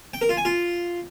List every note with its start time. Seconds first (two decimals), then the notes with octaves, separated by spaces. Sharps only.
0.14 G5
0.21 A#4
0.29 F4
0.37 G#5
0.45 F4